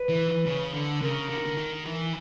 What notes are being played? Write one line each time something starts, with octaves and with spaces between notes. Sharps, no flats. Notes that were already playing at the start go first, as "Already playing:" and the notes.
Already playing: B4
E3
C#3
D3
C#3 A#4
D3
D#3
D3
D#3
E3